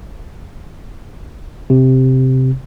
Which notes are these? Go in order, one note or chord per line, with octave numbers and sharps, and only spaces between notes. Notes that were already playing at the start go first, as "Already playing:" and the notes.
C3